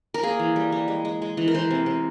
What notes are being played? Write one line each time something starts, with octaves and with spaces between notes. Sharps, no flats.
A#4
A#3 G#4
E3
G3
G3
G#3
G#3
G#3
E3
A#4
E3 C5
C3
C3